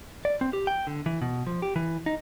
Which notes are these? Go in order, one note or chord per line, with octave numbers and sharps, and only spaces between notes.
D5
C4
G4
G5
D3
E3
B2
F3
G4
E3
D#4